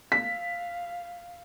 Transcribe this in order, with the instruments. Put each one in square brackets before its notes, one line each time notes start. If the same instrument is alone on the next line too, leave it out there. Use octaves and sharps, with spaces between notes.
[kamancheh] F5 [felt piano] B6